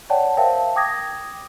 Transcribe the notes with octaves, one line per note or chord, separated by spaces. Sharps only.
C#5 D5 F#5 G5 A5
A#4 C5 E5 F5 G5 A5
G5 D6 D#6 G#6 A#6